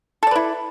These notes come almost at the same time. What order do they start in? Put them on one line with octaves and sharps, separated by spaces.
A4 D5 B4 E4